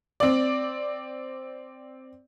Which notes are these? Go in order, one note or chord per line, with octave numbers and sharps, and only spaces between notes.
C4 D5